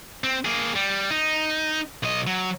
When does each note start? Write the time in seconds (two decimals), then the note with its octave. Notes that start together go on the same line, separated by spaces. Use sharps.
0.24 C4
0.45 A#3 G#4
0.75 G3
1.11 D#4
2.03 B1 D#5
2.27 F#3